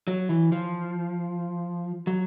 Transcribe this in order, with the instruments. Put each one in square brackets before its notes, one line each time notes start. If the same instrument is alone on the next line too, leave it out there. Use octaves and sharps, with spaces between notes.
[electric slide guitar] F#3
E3
F3
F#3